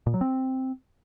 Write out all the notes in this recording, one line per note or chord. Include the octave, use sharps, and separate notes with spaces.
A#2
F#3
C4